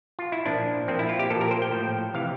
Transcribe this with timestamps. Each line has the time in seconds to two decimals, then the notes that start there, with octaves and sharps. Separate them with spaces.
0.19 F4
0.32 E4
0.46 A#2 F3 D4
0.88 A#2 F3 C4
0.99 E4
1.09 F4
1.19 G4
1.30 A#2 F3 A4
1.41 A#4
1.51 C5
1.62 G5
1.72 A2 F3
2.14 C3 E3 F5